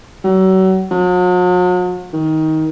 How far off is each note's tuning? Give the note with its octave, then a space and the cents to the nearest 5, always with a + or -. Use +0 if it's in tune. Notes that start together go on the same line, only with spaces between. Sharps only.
F#3 +35
F#3 -45
D#3 +20